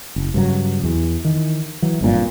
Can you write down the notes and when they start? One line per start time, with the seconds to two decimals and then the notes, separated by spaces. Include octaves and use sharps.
0.16 F#1
0.34 G2 C#3 F#3
0.84 E2 E3
1.25 D#3 E3
1.82 E3 F#3
2.01 G#1 G2 A#2